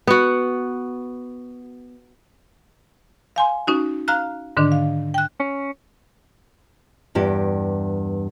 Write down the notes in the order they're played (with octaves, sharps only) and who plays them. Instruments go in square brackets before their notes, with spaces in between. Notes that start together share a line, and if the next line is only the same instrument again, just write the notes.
[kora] B3 F#4
[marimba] F5 G#5 C6
C#4 D#4 F#4
F5 A#5 F6 F#6
G#2 D3 D#3 D4
F5
G5 F#6
[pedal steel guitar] C#4
[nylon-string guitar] E2 G2 G4